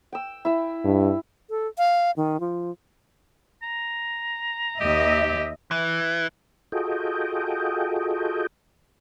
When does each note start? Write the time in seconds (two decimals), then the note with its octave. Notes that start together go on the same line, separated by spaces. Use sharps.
0.12 G5 E6
0.45 E4 E6
0.84 G2
1.50 A4
1.78 F5
2.17 D#3
2.40 F3
3.62 A#5
4.80 D#2 G4 D#5 E5
5.71 E3
6.72 F4 F#4 G#4 A4 D#5 G5